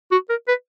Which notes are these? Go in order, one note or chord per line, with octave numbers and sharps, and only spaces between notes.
F#4
A#4
B4